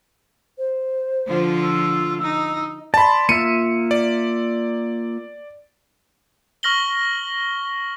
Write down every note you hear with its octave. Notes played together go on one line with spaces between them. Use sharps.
C5
D3 F3 F4
E6
D#4
D5 A5 B5 C6
A#3 F4 E5 C#7 D#7
D5
C#6 F6 A#6 F#7 G7